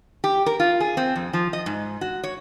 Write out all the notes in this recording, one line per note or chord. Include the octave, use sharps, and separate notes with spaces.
G4
A#4
F4
G#4
C4
F2
F3
D#5
G#2
F#4
C#5